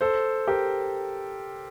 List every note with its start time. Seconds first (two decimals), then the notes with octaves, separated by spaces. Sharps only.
0.01 A4 C5
0.47 G4 A#4